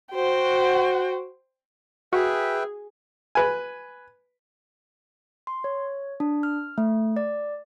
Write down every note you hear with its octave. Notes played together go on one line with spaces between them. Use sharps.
F#4 C5 G5
F#4 G#4 B4 E5 G5
B4 G#5
C6
C#5
D4
F6
A3
D5